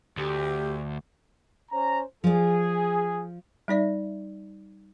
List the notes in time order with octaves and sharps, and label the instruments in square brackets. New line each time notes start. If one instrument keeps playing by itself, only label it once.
[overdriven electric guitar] D2 [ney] G4
[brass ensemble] C#4 C5 A#5
[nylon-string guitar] F3 D5 [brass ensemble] G#4
[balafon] G3 D#4 D5 E5